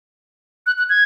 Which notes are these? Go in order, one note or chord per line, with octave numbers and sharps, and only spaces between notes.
F#6
F#6
G#6